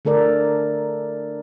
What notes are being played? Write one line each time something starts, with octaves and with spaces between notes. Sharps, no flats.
D3 A3 A4 A#4 D5